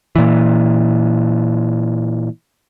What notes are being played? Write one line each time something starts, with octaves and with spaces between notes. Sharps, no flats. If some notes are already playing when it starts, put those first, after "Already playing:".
A#2 E3